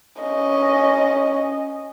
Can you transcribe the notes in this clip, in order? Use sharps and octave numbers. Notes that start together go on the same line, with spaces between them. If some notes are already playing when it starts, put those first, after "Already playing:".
C#4 D#5